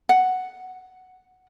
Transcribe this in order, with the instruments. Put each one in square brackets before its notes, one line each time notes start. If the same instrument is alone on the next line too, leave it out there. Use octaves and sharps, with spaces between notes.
[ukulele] F#5